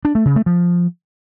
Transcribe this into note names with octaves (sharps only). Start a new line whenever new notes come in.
D4
A3
C#3
A3
F3